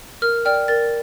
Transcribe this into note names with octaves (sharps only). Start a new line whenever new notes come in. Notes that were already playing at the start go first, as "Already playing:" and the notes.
A#4 F6
D5 G5 F6
A#4 A6